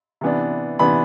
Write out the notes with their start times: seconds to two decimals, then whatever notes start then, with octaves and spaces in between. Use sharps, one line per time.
0.21 C3 E3 B3 D4
0.79 C3 E3 B3 D4 B5